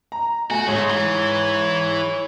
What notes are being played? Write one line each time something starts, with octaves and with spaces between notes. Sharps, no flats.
A#5
A3 F#4 G#5
G#2 G#3 A3 C#5
E3